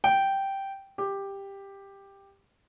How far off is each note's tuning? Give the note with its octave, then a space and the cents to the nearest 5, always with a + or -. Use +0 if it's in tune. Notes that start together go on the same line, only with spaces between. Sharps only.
G5 -5
G4 +10